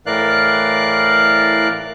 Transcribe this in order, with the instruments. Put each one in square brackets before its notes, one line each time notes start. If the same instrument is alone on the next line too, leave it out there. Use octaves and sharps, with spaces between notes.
[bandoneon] A2 E3 A#4 D5 F5 F#6